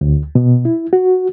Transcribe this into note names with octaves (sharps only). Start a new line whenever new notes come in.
D2
B2
E4
F#4